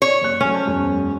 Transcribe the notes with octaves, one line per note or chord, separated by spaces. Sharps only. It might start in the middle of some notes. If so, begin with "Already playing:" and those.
C#5
F#1 F#6
F#3 A3 C#4
C5 A5 G6
E1 F#2